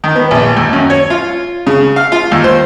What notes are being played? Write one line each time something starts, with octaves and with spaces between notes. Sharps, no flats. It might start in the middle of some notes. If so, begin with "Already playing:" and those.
D#3
B3
A#1
D#2
F#2
C#5
F4
C#3
F5
F4
D#2
C5